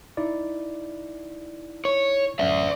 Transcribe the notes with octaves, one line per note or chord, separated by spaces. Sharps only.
D#4 E4 D5
C#5
A1 F#2 D5 E5